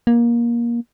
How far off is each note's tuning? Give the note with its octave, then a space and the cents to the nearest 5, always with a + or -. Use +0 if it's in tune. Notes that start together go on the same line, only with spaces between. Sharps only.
A#3 +20